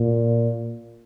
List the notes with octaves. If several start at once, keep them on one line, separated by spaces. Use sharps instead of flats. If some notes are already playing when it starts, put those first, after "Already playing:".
Already playing: A#2